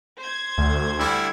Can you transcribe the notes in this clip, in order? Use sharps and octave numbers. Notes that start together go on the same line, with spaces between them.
C5 G#6
D2
D3 G3 E4